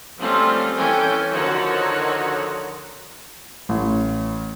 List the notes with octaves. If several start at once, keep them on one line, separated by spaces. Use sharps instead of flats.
F3 G3 A3 C4 C#4 F4
E3 C#4 A4 G5 G#5
D3 D#3 F3 D#4 F#4 C#5
A1